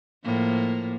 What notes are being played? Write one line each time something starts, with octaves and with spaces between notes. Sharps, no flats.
A2 F3 A#3